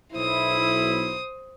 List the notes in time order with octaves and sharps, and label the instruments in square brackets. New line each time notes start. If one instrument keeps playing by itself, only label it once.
[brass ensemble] B1 E4 [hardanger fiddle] C5 D#6